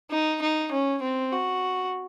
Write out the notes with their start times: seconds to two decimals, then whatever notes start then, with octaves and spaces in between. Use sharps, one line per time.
0.11 D#4
0.42 D#4
0.72 C#4
1.02 C4
1.32 F#4